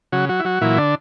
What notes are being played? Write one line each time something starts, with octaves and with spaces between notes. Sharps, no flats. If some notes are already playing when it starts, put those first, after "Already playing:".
C#3 F#3 F#4
F#3 F#4
E4
F#3 F#4
A#2 E3 F#3 E4
D3 D4